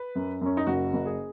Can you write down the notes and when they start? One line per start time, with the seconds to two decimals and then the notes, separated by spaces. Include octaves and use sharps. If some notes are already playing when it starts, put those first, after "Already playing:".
Already playing: B4
0.15 F#2
0.41 F#2 C#4
0.57 D#4
0.67 F#1 F#4
0.93 F#1
1.06 G#4